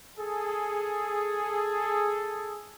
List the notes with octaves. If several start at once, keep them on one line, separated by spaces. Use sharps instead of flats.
G#4 A4